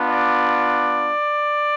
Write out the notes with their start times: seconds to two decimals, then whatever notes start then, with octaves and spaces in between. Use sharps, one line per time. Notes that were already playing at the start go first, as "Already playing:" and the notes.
Already playing: B3 D4 F4
0.09 D5